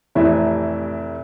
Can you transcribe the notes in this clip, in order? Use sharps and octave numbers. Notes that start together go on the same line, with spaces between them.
F1 A2 C3 E3 E5